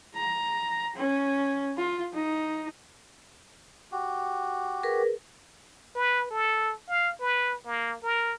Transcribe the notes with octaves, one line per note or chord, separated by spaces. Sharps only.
A#5
C#4
F4
D#4
F#4 G4
G#4 A#4 B4
B4
A4
F5
B4
A#3
A#4